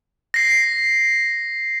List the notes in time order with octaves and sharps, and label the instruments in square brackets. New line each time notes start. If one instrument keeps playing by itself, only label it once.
[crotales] A#6 C7